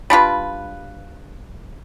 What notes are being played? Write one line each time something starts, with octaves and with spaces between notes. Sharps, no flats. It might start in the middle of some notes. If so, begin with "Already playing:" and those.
G3 D4 F4 B4